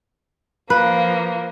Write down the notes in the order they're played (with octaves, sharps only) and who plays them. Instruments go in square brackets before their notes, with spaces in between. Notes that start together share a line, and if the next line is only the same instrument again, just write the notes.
[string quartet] F3 A#3 [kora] B4